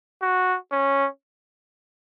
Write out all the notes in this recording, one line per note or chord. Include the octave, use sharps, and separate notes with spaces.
F#4
C#4